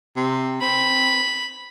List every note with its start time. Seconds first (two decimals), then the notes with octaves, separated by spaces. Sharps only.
0.16 C3
0.61 C4 B5